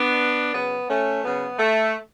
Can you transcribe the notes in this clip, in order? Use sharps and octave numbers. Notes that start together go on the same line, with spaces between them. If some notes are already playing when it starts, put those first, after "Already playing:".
Already playing: B3 D4
C#3 F#3 B3
A3 C#4
C#3 F#3 B3
A3